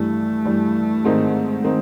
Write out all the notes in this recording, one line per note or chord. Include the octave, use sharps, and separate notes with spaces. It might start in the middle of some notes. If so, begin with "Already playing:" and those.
Already playing: G2 E3 G3 A3
G2 E3 G3
G#2 D#3 G#3 C4 D#4
D#3 G#3 C4 D#4